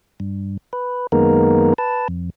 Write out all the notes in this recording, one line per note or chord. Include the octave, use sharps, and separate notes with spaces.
G2
B4
F#2 D#3 G#3 A#3 B3 A#4
B4 A5
F2